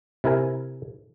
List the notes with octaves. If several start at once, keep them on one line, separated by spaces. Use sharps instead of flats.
C3 E4 A#4 G#5